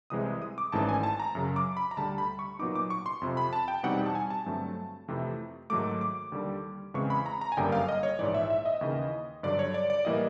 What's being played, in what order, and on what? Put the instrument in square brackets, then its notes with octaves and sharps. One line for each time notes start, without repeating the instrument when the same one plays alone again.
[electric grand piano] C2 C3 E3 G#3 C4 D#6
D#6
D6
G#1 G#2 E3 A3 C#4 A5
G#5
A5
A#5
F#2 C#3 F#3
D6
B5
A#5
D2 D3 G3 A5
B5
C#6
A#2 F#3 B3 D#4 D6
D6
C#6
C6
F2 C3 F3
B5
A5
G5
E2 B2 G3 C4 D#4 F#5
A5
G#5
A5
G2 D3 F#3 A3 C4
F2 C3 E3 A3 C4
G#2 D#3 F#3 A3 D6
D6
D#2 D3 G3
E2 C#3 E3 G#3 C4 C#6
B5
A#5
A#5
G#5
G1 F#2 D3 G3 A#3 G5
F5
D#5
C#5
A#1 G#2 E3 D5
E5
E5
D#5
D#2 C#3 E3
G2 D3 F#3 D5
C#5
D5
D5
A2 E3 G3 A#3 D#5